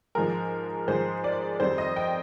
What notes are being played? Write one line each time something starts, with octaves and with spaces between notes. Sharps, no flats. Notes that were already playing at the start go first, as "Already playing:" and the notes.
G#2 F3 G#3 A#4
G#2 F3 G#3 C5
D5
F2 D#3 G3 C5
D#5
G5